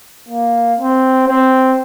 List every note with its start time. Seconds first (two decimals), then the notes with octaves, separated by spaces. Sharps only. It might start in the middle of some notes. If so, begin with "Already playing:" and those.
0.29 A#3
0.79 C4
1.28 C4